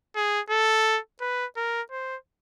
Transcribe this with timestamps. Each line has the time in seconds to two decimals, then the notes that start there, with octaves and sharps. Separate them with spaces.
0.16 G#4
0.50 A4
1.21 B4
1.57 A#4
1.91 C5